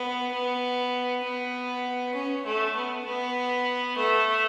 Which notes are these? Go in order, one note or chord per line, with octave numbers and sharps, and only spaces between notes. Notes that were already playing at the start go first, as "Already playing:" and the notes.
Already playing: B3
B3
B3
C#4
A3
B3
B3
A3